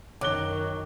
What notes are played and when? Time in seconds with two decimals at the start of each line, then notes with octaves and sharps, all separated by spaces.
0.21 F#2 D#3 F#3 D6 F#6 G7